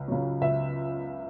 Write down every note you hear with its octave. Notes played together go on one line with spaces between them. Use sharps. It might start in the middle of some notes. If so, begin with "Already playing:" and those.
Already playing: C#2
C#3 F#3
C#2 E5